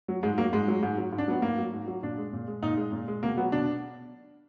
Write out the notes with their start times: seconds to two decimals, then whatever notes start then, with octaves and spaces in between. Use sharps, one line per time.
0.08 F#3
0.23 G#2 G#3
0.38 F#3 A#3
0.53 G#2 G#3
0.68 F#3
0.83 G#2
0.98 F#3
1.13 G#2
1.18 D4
1.28 F#3 B3
1.42 G#2 A#3
1.58 F#3
1.73 G#2
1.87 F#3
2.03 A#2 D4
2.18 G#3
2.33 A#2
2.48 G#3
2.63 A#2 D#4
2.77 G#3
2.92 A#2
3.08 G#3
3.23 B2 A#3
3.37 F#3 B3
3.52 B2 D4